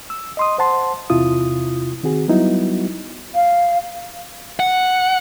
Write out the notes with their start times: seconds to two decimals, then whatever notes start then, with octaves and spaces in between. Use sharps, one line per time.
0.10 E6
0.37 D#5 C6 D#6
0.58 C5 F#5 A5 C6
1.10 E2 C3 E4 F4 D#6
2.03 D#3 C4 F#4 G#4
2.28 F#3 G3 B3 D#4 E4 F#4
3.35 F5
4.60 F#5